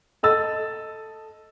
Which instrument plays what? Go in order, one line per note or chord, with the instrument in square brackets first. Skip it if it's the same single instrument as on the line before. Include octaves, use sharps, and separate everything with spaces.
[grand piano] A4 D#5 E6 A6